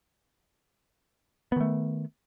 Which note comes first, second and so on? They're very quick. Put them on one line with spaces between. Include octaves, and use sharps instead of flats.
B3 D#3 A3